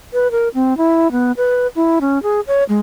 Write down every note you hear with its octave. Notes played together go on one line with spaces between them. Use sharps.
B4
A#4
C4
E4
B3
B4
E4
C#4
G#4
C#5
G#3